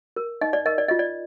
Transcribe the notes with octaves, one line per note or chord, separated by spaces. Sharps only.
A#4
D#4 D#5
D5
A#4 D#5
D5
F4 D#5
D5